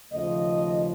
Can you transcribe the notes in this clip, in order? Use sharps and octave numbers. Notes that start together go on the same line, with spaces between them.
D#2 C#3 F3 A3 D#5